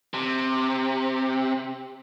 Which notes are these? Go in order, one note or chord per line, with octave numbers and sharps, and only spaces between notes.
C3